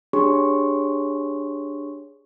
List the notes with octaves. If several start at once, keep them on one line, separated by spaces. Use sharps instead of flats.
D4 G4 G#4 C#5 C6 C#6